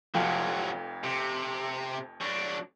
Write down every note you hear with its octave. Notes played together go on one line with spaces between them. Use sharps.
F1 F2 C3 F#3 F4
C3
F#3 D4